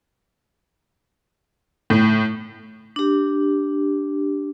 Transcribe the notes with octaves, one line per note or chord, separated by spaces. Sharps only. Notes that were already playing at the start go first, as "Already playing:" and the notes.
A2
D4 G4